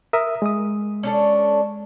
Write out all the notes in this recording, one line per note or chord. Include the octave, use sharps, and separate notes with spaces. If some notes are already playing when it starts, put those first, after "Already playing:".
A#4 E5 D#6
G#3 D#6
C#4 D4 A4